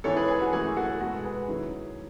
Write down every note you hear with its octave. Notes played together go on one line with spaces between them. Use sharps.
G#2 E3 G#3 B3 E4 A4 C#5
G#4 B4
G#4
F#4
F#2 E3 A3 G#4
F#4 A4
G#4
B2 G#3 B3 F#4 A4
G#4 B4
D#3 F#3 C#4 E4